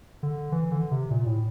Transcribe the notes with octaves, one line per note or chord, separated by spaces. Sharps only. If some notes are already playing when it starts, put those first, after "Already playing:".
D3
E3
D3
C3
A#2
A2